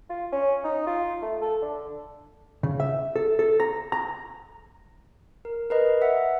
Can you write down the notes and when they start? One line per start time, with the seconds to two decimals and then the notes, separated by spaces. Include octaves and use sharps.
0.10 F4
0.32 C#4
0.64 D#4
0.87 F4
1.22 A3
1.41 A4
1.62 D3
2.63 C#3
2.80 E5
3.16 A4
3.39 A4
3.60 A#5
3.92 A#5
5.45 A#4
5.70 A#4 B4 D#5
6.02 E5 F#5